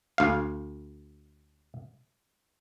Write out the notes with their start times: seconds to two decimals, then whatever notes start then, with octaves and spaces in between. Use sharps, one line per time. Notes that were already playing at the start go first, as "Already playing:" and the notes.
0.18 D2 F5